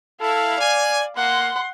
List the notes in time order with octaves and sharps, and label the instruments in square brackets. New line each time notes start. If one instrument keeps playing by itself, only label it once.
[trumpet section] E4 [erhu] A4 [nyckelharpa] F5
[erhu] D5 [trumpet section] G#5
[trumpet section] A#3 [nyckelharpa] F#5 [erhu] C6